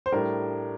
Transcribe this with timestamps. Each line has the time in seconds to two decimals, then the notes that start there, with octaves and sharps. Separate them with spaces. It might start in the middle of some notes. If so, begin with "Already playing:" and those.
0.06 C5
0.12 A2 G3 D4 A#4